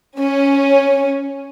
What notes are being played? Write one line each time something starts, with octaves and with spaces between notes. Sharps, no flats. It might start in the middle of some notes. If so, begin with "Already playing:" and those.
C#4